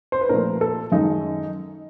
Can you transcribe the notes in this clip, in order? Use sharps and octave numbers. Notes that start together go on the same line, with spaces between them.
C5
B4
A#2 F3 A3 A#4
A4
F#2 D#3 G#3 D#4